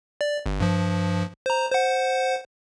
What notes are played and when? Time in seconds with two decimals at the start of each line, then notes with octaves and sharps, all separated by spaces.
0.21 D5
0.46 G1
0.60 G2 F3
1.46 C5 A#5
1.72 C5 F#5